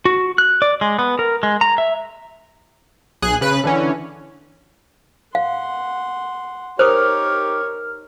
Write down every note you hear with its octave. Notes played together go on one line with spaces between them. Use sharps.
F#4
F#6
D5
G#3
B3
A#4
G#3
A#5
E5
B1 G#4 F#6
C#3 B4 F#6
D3 E3 C#4
F5 F#5 C6
D#4 G4 A#4 C5 C#5 D#6 F6